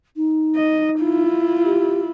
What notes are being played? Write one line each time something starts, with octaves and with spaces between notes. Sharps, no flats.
D#4
D#5
E4 F4
G4